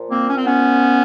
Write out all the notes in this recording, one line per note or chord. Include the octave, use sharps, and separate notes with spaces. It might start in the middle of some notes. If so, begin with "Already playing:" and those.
Already playing: A#2 F3
A#3 C4
C#4
C4
B3 C#4